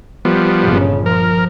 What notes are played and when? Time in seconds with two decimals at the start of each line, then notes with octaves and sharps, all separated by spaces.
0.25 F3 G3 B3
0.62 G1 A#2 C#3
1.06 F3 A#4